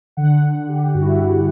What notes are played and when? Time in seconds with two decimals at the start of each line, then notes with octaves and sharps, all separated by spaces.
0.17 D3 F#5
0.43 F#5
0.55 D3
0.68 G4
0.94 G2 F#4
1.01 E4
1.09 F#4